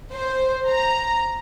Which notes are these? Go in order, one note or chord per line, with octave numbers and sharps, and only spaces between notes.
C5
A#5